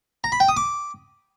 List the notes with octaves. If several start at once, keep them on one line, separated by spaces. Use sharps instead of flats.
A#5
B5
G5
D#6
D6